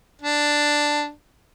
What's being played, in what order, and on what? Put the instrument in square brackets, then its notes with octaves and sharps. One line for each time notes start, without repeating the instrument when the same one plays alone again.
[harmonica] D4